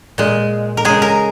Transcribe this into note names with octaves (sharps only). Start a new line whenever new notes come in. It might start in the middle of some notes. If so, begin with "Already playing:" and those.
A#2 G#3
A#4
C#3 G#3 G#4
A#4